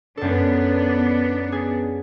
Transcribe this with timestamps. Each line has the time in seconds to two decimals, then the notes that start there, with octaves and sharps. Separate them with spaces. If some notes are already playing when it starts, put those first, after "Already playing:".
0.17 F#2 B3 D4 A4
1.52 G#4